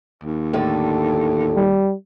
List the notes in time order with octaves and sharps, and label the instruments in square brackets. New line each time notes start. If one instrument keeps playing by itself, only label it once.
[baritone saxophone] D#2
[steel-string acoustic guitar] A2 D3 A4
[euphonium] G3